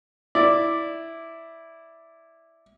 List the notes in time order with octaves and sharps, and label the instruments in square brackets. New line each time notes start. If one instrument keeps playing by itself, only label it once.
[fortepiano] E4 D5